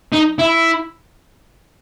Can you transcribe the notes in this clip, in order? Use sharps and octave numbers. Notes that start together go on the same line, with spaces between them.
D#4
E4